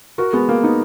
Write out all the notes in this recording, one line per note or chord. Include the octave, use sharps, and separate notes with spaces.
F#4 A#4
G#3 B3
A#3
B3 D#4